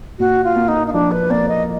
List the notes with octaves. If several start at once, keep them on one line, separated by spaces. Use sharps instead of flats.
A#2 F#4
F4
A#3
D#4
D#4
F3 D4
B4
A#3 D5
D#5